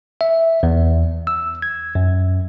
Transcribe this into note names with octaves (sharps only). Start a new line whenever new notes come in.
E5
E2
E6
G#6
F#2